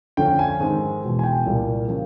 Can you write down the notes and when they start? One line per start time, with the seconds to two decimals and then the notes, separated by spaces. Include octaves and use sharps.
0.17 F2 D3 F3 A3 C#4 G5
0.39 G#5
0.60 G#2 D#3 G#3 C4
1.03 E2 B2 G#3
1.19 G#5
1.24 G5
1.45 C2 A#2 G3 A#3
1.88 C#3 F3 A#3